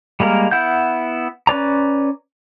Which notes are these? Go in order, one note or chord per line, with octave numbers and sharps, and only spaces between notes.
G3 G#3 A#3 A#4
B3 E4 F#5 G6
C#4 B4 D5 A#5